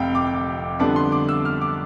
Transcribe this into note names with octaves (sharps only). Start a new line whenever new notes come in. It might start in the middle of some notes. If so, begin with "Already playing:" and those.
Already playing: F1 F2 C3 F5 G5
D6
F2 D3 G3 B3 D4 D6
C6
D6
E6
F6
D6